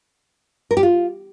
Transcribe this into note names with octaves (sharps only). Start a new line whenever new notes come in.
A#4
G4
F4